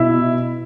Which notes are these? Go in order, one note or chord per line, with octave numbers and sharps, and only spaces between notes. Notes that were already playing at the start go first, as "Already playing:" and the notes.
Already playing: B2 E4 E5